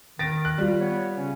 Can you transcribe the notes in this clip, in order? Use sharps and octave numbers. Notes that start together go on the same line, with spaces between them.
D#3 A6 A#6 D7
F#6
G3 F4
B3 C#5
C#3 C#4